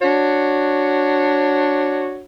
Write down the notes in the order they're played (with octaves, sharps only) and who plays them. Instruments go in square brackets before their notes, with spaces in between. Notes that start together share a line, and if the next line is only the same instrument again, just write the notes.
[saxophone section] D4 F#4 C#5